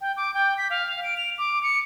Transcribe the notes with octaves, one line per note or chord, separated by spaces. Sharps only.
G5
D6
G5
B6
F5
D7
F7
D6
C#7